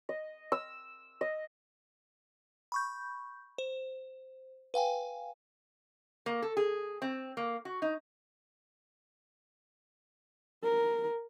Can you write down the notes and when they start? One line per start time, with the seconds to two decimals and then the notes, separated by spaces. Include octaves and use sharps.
0.09 D#5
0.52 E6
1.21 D#5
2.72 B5 C#6 G6
3.58 C5
4.74 B4 F5 G5 G#5
6.26 A#3
6.42 A4
6.57 G#4
7.02 C4
7.37 A#3
7.65 F#4
7.82 D#4
10.63 A#4